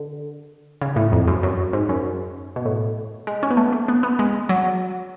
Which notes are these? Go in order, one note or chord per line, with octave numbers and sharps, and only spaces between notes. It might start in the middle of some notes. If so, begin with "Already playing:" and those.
Already playing: D3
C#3
A2
F2
F#2
F#2
G#2
F#2
B2
A2
G#3
C#4
B3
A3
A3
B3
B3
G#3
F#3